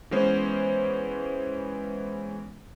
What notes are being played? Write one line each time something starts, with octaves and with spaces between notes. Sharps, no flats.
E3 G#3 B3 C#4 C5